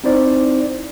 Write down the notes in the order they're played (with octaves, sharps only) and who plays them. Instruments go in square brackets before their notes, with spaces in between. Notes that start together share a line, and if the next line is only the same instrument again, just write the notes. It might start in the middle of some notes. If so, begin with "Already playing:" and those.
[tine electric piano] C4 D#4 E4 C5 D5